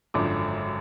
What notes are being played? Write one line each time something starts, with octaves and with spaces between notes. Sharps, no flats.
G#1 F#2 D3 F3 D6